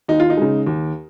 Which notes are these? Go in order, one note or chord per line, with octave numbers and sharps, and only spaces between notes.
D#2 D#4
F4
D#4
C#3 G#3
D#2